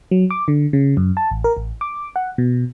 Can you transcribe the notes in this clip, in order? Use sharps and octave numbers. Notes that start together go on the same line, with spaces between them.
F#3
D6
D3
C#3
F#2
A5
A1
A#4
A1
D6
F#5
B2